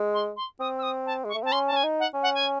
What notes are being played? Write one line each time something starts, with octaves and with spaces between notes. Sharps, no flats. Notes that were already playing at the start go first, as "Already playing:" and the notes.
Already playing: G#3
C6
C6
C4 D#6
E6
D#6
A5
G#3 C#6
A3
C4 A5
C#4 C6
A5
C#4 G#5
D#4
F#5
C#4
F#5
G#5